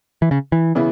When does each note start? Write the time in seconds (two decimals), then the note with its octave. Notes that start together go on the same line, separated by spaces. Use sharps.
0.22 E3
0.31 C#3
0.52 E3
0.75 C#3 E3 B3 E4